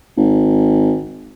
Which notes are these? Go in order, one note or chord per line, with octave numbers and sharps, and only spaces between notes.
G#1